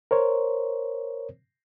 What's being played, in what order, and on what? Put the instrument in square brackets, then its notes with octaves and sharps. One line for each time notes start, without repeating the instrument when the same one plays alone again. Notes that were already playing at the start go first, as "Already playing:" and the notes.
[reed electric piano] A#4 C5 C#5